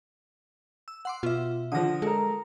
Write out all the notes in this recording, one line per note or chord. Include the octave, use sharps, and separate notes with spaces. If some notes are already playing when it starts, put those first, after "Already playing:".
E6
F#5 C6 D6
B2 F4 E5
D3 F3 D#6 A#6
G#3 A4 A#4